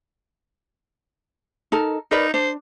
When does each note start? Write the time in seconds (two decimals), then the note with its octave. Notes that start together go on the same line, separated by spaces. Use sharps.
1.72 D#4 A4 A#4
2.11 D#4 A#4 B4 D5
2.34 D4 C5